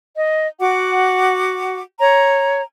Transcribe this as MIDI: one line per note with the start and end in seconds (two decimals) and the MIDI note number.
0.16 0.46 75
0.60 1.80 66
0.60 1.80 78
0.60 1.80 86
2.01 2.61 73
2.01 2.61 82